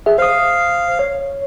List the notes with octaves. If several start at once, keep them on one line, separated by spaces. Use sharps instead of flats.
G#4 E5
C5 F5 D#6
C#5